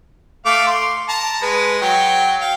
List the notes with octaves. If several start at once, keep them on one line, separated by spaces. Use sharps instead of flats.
A3 F5 D6
C6
A5 A#5
G#3 B4
F#3 G5
F5 G5